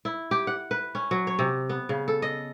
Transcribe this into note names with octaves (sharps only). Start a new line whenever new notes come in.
E4
G4
F#5
B4
C#4
F#3
C#5
C3
B3
C#3
A4
D#5